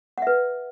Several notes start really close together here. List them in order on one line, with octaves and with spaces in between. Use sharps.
F#5 E5 B4